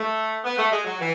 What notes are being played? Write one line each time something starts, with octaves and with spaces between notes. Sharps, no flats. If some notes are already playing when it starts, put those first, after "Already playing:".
Already playing: A3
B3
A3
G#3
F#3
E3